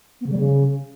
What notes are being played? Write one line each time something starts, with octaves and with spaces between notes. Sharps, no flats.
B3
C#3
G3
C#3